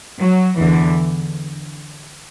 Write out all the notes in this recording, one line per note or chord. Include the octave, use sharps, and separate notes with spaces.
F#3
E2 D3 E3